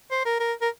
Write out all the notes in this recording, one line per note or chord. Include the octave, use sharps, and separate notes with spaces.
C5
A#4
A#4
A#4